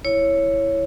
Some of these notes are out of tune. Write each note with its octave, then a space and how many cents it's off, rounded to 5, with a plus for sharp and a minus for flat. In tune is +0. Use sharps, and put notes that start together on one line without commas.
E4 +5 C#5 +0